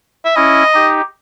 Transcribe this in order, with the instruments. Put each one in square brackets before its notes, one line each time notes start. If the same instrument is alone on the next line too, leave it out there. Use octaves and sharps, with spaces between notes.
[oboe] E5
[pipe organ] C#4 E4 [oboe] D#5
[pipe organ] D#4 G4